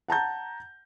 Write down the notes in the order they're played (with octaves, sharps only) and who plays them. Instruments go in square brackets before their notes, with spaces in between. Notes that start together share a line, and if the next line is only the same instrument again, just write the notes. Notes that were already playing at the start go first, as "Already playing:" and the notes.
[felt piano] F#5 A5 A#5 G6